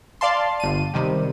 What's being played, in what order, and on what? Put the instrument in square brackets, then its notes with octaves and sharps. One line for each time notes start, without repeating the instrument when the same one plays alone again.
[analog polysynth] D5 F5 A5 C6
G1 D#7
C3 D#3 G3